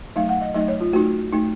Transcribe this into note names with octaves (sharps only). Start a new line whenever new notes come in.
F#3 A3 D#4 F5
F#5
D#5
F#3 A3 D#4 D#5
C#5
F4
A3 D#4 F#4
A3 D#4